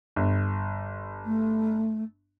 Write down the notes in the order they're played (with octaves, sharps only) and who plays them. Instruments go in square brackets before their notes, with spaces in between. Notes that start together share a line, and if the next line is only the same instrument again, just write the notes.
[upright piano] G1
[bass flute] A3